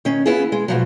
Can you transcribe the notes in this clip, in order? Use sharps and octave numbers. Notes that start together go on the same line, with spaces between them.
D#3 C#4
B3 E4 F4 G#4
G#3
B2 F3 F#3